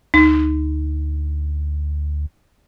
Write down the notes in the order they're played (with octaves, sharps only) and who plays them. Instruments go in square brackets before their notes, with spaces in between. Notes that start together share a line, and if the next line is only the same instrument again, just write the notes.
[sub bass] D2 [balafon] D#4